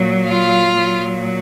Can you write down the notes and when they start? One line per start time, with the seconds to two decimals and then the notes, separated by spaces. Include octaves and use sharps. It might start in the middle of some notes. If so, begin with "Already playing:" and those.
Already playing: A#2 F#3
0.28 F4 F5
0.74 A#2 F#3